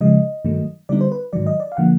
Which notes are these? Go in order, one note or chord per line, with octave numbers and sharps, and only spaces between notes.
C#3 F3 G#3 D#5
G2 D#3 F#3 A3
D3 G3 B3 D#4 D5
C5
B4
G#2 D#3 F#3 D5
D#5
D5
F5
D3 F3 A#3 F#5